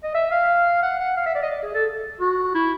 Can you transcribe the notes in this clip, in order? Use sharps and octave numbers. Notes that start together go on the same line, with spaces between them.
D#5
E5
F5
F#5
F#5
F5
E5
D5
D#5
D5
G#4
A4
F#4
E4